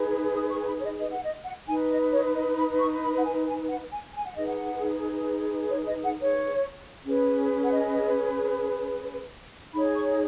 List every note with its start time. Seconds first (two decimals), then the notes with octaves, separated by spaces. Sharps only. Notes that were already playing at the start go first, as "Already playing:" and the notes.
Already playing: D#4 G#4 B4
0.33 D#6
0.51 C#6
0.61 G#5
0.67 B5
0.80 C#5
0.84 D#5
1.01 D#5
1.12 F#5
1.24 D#5
1.46 F#5
1.68 D#4 B4 G#5
1.91 D#5
2.13 C#5
2.35 D#5
2.58 B5
2.80 C#6
3.03 B5
3.17 F#5
3.24 G#5
3.47 G#5
3.69 F#5
3.92 G#5
4.14 G#5
4.26 F#5
4.36 D#4 G#4 B4 D#5
4.48 F#5
5.71 C#5
5.87 D#5
6.04 F#5
6.21 C#5
7.05 C#4 G#4 B4
7.63 F#5
7.72 D#5
9.74 D#4 G#4 C#5 B5
9.96 C#6